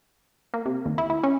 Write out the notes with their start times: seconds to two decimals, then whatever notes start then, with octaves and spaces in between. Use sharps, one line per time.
0.54 A#3
0.65 C3
0.86 D#2
0.98 E4
1.10 E4
1.23 C#4